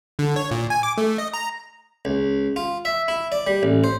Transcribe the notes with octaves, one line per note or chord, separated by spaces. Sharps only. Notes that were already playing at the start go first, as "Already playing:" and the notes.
D3
C#5
A#2
G#5
D6
A3
D#5
A#5
C#2
F4
E5
E4
D5
G3
A1
C5